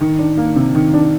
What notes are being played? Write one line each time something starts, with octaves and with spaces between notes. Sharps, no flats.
D#3
D4
A#3
C3
D#3
D4